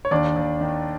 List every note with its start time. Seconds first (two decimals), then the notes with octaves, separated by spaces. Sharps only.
0.05 C#5
0.11 D#2 D4 D5
0.36 D#2
0.61 D#3